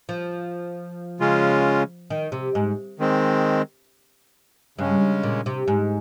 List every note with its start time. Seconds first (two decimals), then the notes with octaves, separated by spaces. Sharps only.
0.09 F3
1.20 C#3 G#3 C#4 F4
2.10 D#3
2.32 C3
2.55 G#2
2.99 D#3 G#3 C4
4.78 G2 C#3 G#3 C#4
5.23 A#2
5.46 C3
5.68 G#2